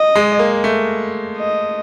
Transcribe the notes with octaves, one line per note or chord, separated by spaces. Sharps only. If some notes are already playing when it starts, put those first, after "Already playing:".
Already playing: D#5
G#3
A#3
A3
D#5